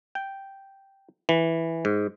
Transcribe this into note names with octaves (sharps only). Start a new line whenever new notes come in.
G5
E3
G#2